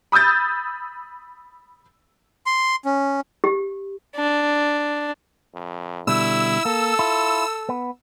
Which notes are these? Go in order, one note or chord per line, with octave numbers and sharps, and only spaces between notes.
B5 D#6 E6 G6 A6
C6
C#4
G4
D4
F2
B2 D3 G3 E4 E6
A#3 A4
E4 F4
B3